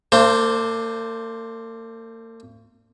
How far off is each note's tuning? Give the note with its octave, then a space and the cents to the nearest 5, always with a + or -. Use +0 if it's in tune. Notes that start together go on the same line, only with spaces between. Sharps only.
A#3 -45 D4 +0 C5 +0